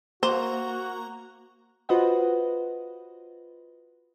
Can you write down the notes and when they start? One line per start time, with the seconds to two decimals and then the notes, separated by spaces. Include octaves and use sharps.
0.23 A#3 F#4 C5 A#5
1.89 F4 F#4 B4 C5 D#5 F#5